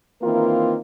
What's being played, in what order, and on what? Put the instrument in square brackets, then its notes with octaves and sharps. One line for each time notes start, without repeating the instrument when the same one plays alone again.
[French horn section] D#3 E3 A#3 C4 F4 A#4